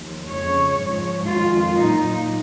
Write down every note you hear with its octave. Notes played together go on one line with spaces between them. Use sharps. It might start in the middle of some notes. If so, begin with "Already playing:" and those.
Already playing: D#2 F3
F2 C#3 G#3 C#5
G#2 F3 G#3
F2 D#3 G#3 F4
A#2 F#3 D#4